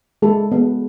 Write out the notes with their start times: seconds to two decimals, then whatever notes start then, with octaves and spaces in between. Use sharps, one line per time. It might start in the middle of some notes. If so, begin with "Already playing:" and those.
0.22 G#3 A4
0.52 B3